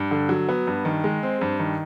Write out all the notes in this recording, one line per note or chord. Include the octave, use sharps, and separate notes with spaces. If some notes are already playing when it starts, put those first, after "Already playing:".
Already playing: G2
D3
F#3
B3
G2
D#3
G#3
C4
G2
D#3